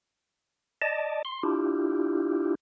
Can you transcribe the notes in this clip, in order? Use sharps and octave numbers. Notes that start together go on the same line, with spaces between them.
D5 D#5 A5
C6
D4 E4 F4 G4